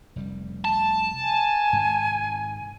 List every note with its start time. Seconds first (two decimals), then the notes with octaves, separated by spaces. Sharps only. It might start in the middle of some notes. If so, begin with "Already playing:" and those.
0.16 F1 G3
0.65 A5
1.21 G#5
1.73 G#2 C3 D#3